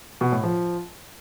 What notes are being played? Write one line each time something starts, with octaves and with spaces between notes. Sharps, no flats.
B2
A2
F3